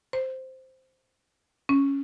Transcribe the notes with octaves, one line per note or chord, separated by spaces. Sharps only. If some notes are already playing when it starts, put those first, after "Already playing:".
C5
C#4